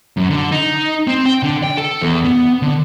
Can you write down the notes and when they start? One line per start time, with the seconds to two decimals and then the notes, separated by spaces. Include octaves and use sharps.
0.17 F#2
0.29 D3
0.52 D#4
1.07 C4
1.26 G5
1.43 D3
1.64 G5
1.77 A4
2.01 E2
2.24 B3
2.62 D3